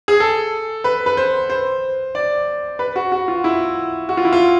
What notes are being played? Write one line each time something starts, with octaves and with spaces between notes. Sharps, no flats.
G#4
A4
B4
B4
C5
C5
D5
B4
F#4
F#4
F4
E4
F#4
F4
E4
F4